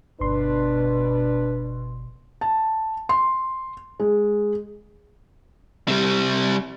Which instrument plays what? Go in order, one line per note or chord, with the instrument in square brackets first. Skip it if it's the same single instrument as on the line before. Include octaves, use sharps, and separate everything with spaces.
[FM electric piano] G1 C6 [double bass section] B2 [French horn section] D4 B4
[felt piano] A5
C6
G#3
[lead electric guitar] C3 G3